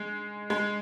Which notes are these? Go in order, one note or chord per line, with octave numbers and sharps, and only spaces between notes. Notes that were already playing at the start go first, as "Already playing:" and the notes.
Already playing: G#3
G#3